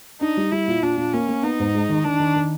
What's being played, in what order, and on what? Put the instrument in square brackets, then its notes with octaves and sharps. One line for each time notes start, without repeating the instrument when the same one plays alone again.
[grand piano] D4 [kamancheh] D#4
[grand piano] G3
[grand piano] G3 [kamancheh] E4
[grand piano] A#2
[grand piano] A#2 [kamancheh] D4
[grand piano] A#2
[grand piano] A#3 [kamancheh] C#4
[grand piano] A#3
[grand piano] B3 [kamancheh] D#4
[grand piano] G#2
G#3
D#3
[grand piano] D#3 [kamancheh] D4
[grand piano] D#3
D#3